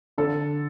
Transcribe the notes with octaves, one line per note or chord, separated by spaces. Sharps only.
D3 A4